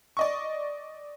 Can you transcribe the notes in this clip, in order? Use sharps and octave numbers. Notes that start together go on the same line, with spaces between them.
D5 D#5 C#6